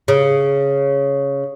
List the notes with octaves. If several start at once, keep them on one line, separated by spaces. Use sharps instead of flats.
C#3